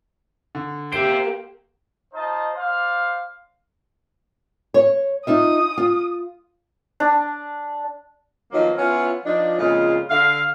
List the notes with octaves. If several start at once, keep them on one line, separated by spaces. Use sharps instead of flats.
D3
A#3 G4 C5 E5 D7
D#4 F4 C5 D#5 A5
C5 D5 F5
C#5
D#4 F4 E5 D#6
F4
D4
D#3 F3 F#3 A#3 B3 D#4
B3 C#4 E4 F4
F3 D4 D#4
F2 A#2 C#3 G#3 F4
D3 F5